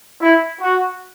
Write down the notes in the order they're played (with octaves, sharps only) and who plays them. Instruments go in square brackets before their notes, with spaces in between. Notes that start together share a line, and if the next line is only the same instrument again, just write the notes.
[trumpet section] E4
F#4